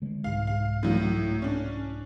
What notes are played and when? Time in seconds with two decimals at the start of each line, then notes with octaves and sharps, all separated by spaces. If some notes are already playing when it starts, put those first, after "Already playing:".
0.02 D3 G#3
0.24 C2 G#2 F5
0.47 F5
0.83 A2 F#3
1.42 C#4 D4